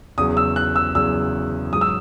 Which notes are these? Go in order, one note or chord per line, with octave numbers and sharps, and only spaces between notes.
E2 C#3 F#3 D#6
E6
F#6
E6
E2 C#3 F#3 E6
G#2 F#3 D#6
E6